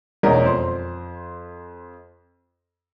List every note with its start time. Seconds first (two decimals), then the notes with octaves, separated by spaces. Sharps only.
0.23 E1 E2 C#4 A#4 D#5
0.44 F2 C5 C6